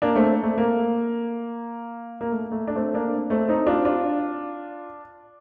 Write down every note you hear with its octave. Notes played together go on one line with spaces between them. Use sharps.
A#3 D4
A3 C4
A3
A#3
A#3
A3
A3
D4
A3 C4
A#3 D4
A3 C4
C4 D#4
D4 F4
D4 F4